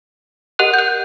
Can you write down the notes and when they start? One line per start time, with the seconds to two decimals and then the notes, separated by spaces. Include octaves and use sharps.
0.59 G4 A#4 D#5 F#5 F#6
0.74 G6
0.79 F#6